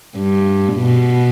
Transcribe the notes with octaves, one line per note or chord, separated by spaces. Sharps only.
G2
B2